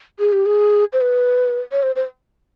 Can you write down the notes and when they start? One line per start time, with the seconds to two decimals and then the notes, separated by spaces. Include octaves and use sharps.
0.19 G#4
0.32 G4
0.46 G#4
0.93 C5
1.01 B4
1.72 C#5
1.83 C5
1.96 C5